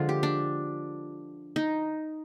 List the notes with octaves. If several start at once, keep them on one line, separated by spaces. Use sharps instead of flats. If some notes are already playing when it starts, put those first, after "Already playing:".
Already playing: D3 F3 G#3 F4
G4
D4
D#4